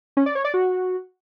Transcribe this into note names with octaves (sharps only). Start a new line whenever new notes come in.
C#4
D5
C#5
D5
F#4